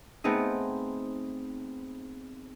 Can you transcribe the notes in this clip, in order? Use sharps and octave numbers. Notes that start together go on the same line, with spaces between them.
A3 B3 C4 D#4 G#4